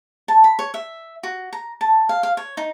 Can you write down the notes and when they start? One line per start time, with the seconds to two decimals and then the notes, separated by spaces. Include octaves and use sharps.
0.28 A5
0.44 B5
0.59 C#5
0.74 E5
1.23 F#4
1.53 A#5
1.81 A5
2.09 F5
2.23 F5
2.37 C#5
2.57 D#4